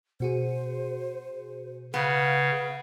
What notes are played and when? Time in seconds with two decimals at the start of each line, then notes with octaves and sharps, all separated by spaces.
0.20 B2 F#4 G#4 C5
1.94 C#3 B3 F5